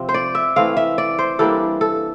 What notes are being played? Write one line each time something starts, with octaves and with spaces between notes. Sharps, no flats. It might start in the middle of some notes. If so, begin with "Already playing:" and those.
Already playing: C3 F3 C4
C5
D5
E5
E3 A3 C4 F5
E5
D5
C5
E3 G3 A#3 D4 A4
A4